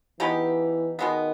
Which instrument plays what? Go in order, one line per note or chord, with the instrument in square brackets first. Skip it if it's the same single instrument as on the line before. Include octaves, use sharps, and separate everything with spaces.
[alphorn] E3 [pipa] G#3 B3 D#4 G4
[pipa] B2 G#3 B3 [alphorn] D#3